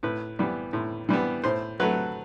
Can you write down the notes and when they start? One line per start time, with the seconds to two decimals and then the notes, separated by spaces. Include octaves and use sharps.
0.03 A2 B4
0.39 E3 G3 B3
0.73 A2
1.09 E3 G3 B3
1.44 A2 C5
1.80 F#3 A3 B4